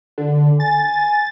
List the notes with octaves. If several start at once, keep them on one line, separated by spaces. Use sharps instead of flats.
D3
G#5 A6